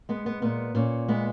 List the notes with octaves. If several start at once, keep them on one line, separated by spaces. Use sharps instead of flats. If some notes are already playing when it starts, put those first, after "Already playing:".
G#3 B3
B3
A#2 B3
A#2 C#4
G#3 B3